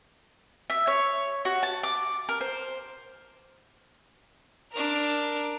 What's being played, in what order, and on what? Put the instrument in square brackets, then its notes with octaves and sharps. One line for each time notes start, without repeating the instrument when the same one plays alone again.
[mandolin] E5
C#5
F#4
A5
D6
A#4
C5
[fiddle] D4 A#4